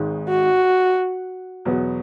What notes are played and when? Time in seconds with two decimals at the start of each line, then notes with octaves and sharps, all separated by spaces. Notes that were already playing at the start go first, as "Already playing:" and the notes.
Already playing: G#1 G#2 D#3 G#3
0.29 F#4
1.65 E2 B2 F#3 B3 F#4